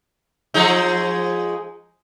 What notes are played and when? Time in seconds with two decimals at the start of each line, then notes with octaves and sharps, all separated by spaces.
0.54 F3 G#3 D#4